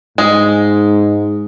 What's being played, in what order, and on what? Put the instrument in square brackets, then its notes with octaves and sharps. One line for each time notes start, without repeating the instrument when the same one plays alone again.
[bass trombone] G#2 [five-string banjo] G#3